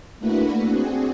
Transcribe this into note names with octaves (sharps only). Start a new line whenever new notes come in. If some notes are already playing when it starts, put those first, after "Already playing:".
A3 A#3 D4 E4 F#4 B4
C4 D4 F#4 G#4